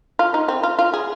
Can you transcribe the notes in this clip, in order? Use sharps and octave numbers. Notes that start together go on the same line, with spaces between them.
F4
D#4
C4
F4
F4
G#4